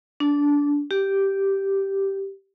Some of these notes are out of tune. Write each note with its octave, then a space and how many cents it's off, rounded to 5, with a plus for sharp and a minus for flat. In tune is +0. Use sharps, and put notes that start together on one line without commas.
D4 -20
G4 -5